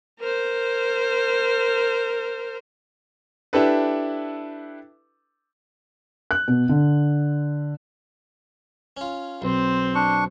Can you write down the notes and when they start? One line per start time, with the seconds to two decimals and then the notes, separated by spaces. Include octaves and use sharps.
0.20 A#4 C5
3.53 D4 E4 G4 A4 B4
6.31 F#6
6.48 B2
6.69 D3
8.97 C#4 F4
9.42 B1 C4 C5
9.95 D4 C#6